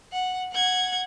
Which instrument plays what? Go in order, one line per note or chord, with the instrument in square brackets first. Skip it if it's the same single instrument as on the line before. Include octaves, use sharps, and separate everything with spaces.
[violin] F#5
F#5 G#6